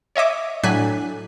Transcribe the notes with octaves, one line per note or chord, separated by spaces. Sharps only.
C#5 D#5 E5 D6
A2 F#3 D4 G#5 F#6 B6